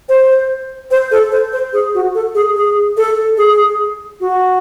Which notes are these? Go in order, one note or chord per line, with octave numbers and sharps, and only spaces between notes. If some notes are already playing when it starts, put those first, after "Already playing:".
C5
C5
A4
C5
C5
G#4
F#4
A4
G#4
G#4
A4
G#4
F#4